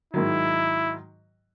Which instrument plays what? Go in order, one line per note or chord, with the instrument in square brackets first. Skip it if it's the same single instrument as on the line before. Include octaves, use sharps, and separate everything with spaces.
[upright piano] G#2 D#3 F#3 [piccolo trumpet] E4